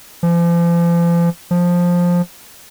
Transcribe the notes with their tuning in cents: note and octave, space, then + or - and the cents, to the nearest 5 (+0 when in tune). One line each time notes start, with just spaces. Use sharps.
F3 -40
F3 +10